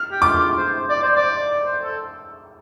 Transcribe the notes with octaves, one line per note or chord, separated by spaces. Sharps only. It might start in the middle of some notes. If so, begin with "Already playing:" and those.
Already playing: F6
G4
F4 D6
C5
D5
C5
D5
C5
A4